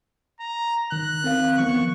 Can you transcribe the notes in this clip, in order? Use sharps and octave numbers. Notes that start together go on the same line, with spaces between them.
A#5
D#3 F#6
C4 A#4 F5
D#3 F3 B3 C#6